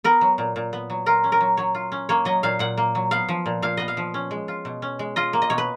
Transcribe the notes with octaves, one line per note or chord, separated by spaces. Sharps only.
B3 A#4
F#3
A#2
A#2
B3
F#3
F4 A#4
C#4
A#4
F#3
F#3 C#5
F4
C#4
A#3 C#5
F#3 D#5
A#2 F5
A#2 F#5
A#3
F#3
B3 F5
F3
A#2
A#2 F5
B3 D#5
F5
F3
C#4
G#3
F4
B2
C#4
G#3
F4 D#5
A#3
D#5
B2 C#5
B4